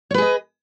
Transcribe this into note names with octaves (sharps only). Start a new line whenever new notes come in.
G#4 B4 C#5 D#5